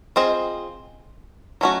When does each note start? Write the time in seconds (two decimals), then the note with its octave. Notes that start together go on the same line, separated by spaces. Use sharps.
0.16 C4 F4 G#4 C5 D#5
1.61 F#3 A3 C#4 F#4